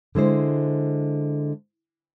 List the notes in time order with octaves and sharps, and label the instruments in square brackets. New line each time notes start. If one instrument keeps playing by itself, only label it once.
[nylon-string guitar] D3 G#3 E4 C5